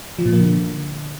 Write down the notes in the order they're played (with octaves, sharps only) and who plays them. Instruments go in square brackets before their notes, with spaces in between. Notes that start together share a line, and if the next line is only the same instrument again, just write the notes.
[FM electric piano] F3
A#2
A#3
D3